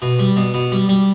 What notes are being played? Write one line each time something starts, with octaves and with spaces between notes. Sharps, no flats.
B2
G3
B2
B2
G3
G3